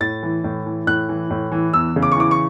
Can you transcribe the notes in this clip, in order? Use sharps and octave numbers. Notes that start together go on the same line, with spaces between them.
A2 A6
E3
A2
E3
A2 F#6
E3
A2
E3
E2 E6
C#3
D6
C#6
E3 D6
C#6